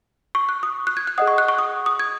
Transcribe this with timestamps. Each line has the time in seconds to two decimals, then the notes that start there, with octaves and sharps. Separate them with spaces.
0.35 C#6
0.49 F#6
0.63 D#6
0.87 F#6
0.97 G#6
1.07 F#6
1.18 G#4 D#5 F#5 D#6
1.27 C#6
1.38 F#6
1.48 C#6
1.59 D#6
1.86 D#6
2.00 G#6